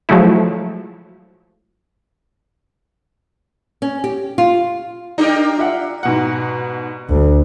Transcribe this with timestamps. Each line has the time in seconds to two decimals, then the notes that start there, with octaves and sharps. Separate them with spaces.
0.09 F3 F#3 G#3 A3 E4
3.82 C#4
4.04 G4
4.38 F4
5.18 D4 D#4 G4 A#4
5.58 F4 E5 F#5
6.03 G#2 B2 F#5
7.09 D2